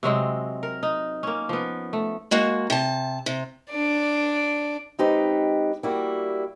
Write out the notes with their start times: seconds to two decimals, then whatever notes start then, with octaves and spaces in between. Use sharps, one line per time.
0.03 C3 F#3 G#3 C4
0.63 A#4
0.83 D#4
1.23 A#3 C#4
1.49 F3 B3
1.93 A3
2.31 G#3 A#3 F#4
2.70 C3 A5
3.26 C3
3.70 D4 D5
4.99 G#3 C4 D#4 G4 B4
5.83 G3 A#3 E4 F#4